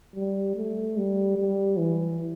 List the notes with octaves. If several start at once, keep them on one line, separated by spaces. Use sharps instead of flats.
G3
A3
G3
G3
E3